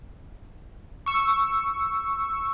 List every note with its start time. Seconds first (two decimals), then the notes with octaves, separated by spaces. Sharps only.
1.06 C#6 E6